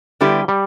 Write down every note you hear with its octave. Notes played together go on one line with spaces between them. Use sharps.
D3 G3 B3 E4 G4
G3